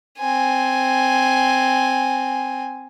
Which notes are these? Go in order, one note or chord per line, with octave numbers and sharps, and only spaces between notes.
C4 G#5